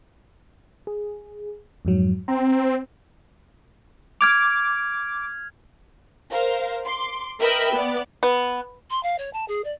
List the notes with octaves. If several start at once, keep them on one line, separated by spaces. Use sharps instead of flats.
G#4
F2 G#2 F#3
C4 A#5
D6 F6 G#6 F7
A#4 C5 F5
C6 D6
A#4 B4 D#5 E5 G5 B5
B3 D5
B3
C6
F5
C#5
A5
G#4
D5